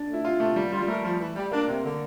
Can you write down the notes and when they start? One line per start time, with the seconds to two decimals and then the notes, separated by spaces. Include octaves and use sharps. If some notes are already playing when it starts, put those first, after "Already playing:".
Already playing: D4
0.08 A3
0.14 E4
0.25 C3 F4
0.40 C3 A3
0.56 G3 A#3
0.72 G3 F4
0.82 G3
0.88 A3 A#4
1.03 F3
1.20 E3
1.36 G3
1.52 A#3 D4
1.68 C3
1.83 D3